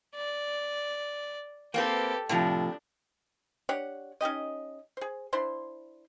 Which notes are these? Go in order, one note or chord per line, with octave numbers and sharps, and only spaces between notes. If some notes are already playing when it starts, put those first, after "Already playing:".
D5
A#3 C4 G4 A4 B4
A2 C3 F3 D4
D4 G4 C#5 F#5
C#4 D#4 G4 D#5
G#4 C5
D4 E4 C5 C6